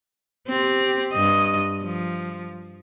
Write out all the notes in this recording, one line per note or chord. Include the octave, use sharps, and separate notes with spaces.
C4 G4
G2 D#5
F3